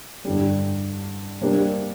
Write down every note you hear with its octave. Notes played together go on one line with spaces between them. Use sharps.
G2 D3 G3
C3 G3 A#3 D4 G4